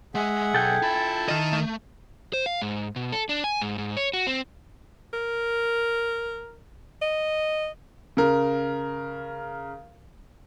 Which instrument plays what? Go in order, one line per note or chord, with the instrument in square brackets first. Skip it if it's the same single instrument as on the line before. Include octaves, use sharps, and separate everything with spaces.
[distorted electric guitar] G#3 [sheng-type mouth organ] G#4 E5 F#5
[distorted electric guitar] B1 [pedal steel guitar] A4 G5 G#5
[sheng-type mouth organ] E4 A5 [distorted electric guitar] F4 B5
[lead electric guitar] D#3 D#5
[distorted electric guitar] A3
[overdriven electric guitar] C5
F5
G#2
B2
A4
D4
G#5
G#2
G#2
C#5
F#4
C4
[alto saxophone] A#4
D#5
[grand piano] C#3 A#4